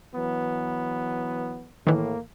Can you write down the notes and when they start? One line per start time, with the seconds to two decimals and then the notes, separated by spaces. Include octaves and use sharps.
0.14 E3 F#3 B3
1.87 A2 D#3 E3 A#3